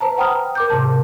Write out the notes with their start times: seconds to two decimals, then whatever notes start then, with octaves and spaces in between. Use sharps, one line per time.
0.01 B4 C5 A5 A#5
0.18 F#5 G5 A#5 B5 D#6 F6
0.55 A#4 D6 G6
0.70 G#2 C3 A5